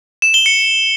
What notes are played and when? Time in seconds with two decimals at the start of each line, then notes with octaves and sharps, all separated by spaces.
0.22 E7
0.34 G7
0.46 C#7